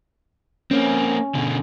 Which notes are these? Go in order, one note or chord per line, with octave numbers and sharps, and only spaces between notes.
A#3 C4 C#4
B2 D3